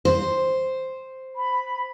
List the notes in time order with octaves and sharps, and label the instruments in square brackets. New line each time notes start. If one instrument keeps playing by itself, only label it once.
[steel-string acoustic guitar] C5
[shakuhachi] B5